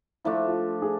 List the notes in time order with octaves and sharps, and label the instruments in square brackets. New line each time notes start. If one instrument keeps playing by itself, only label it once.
[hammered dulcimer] F3 A3 D4 [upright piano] E4
[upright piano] F4
G#4